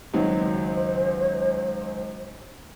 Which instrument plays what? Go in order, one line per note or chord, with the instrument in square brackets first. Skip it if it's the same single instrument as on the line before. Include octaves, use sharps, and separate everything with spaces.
[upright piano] C#2 D#3 F#3 [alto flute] C5